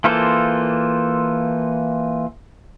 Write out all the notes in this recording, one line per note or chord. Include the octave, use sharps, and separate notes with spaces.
E3 A#3 F4 A4 C5